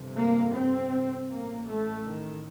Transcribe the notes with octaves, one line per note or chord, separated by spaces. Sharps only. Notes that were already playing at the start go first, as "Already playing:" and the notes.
Already playing: G1 F2 C3
A#3
C4
A1 A2 A#3
A3
D#3